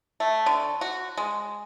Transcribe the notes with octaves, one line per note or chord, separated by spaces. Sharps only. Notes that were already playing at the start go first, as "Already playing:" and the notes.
A3
D3
F#4
G#3